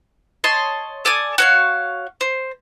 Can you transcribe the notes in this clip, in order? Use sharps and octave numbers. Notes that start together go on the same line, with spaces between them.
C#5 D#5 A5 C6
A4 D5 G#5 D#6
F#4 C#5 F5
C5